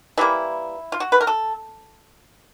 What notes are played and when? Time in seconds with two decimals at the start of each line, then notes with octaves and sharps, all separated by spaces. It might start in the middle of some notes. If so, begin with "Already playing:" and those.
0.17 E3 G3 A#3 E4
0.92 F4
1.00 F#4
1.12 B4
1.21 A#4
1.27 A4